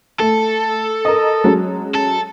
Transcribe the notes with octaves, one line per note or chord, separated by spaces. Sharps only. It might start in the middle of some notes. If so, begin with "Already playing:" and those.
A3 A4
A#4 D#5
F#3 G#3 C#4
A4